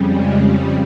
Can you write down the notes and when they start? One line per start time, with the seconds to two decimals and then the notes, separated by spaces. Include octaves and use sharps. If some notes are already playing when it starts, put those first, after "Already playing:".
Already playing: F2 C#3 G3
0.13 G#3
0.45 G3